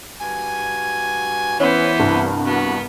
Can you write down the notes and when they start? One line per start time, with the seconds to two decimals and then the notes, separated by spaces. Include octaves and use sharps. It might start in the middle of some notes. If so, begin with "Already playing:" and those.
0.20 G2 F#4 G#5
1.60 E3 B3 C#4 C5
1.99 C2 G2
2.46 B3 F#4